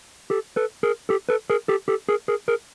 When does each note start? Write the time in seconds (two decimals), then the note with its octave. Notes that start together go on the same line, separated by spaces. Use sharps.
0.30 G4 A4
0.56 A4 B4
0.83 G#4 A#4
1.09 G4 A4
1.29 A4 B4
1.50 G#4 A#4
1.68 G4 A4
1.88 G4 A4
2.09 G#4 A#4
2.28 G#4 A#4
2.48 G#4 A#4